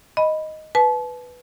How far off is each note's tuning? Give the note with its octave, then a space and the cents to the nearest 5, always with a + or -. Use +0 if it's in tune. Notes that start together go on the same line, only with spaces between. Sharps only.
D#5 +0 B5 +0
B4 +0 A5 -35